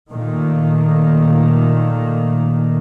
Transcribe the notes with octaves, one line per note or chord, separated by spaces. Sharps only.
A#2 D#3 A3 A#3